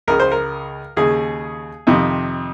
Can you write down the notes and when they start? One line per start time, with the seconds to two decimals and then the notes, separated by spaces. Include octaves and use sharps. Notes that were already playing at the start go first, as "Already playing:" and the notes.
0.08 C#2 C#3 A#4
0.20 C5
0.32 A#4
0.97 D#2 C#3 G#4
1.87 F2 C3 D#3